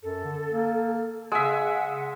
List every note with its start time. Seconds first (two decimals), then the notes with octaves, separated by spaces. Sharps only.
0.03 F#2 A4
0.24 D3
0.51 A#3
1.32 C#3 G#3 E5 F#5